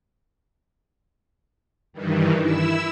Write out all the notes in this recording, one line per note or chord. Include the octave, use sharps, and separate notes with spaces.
G2 D#3 E3
E4 E6